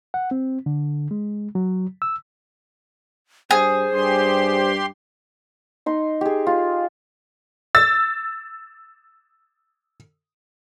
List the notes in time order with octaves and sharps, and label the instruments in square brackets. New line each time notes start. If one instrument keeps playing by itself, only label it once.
[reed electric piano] F#5
C4
D3
G#3
F#3
E6
[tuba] G2 [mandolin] G#4 [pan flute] C5
[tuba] G2 [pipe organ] G4 C6
[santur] D#4 C6
G4 G#4
F4
[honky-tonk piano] E6 A6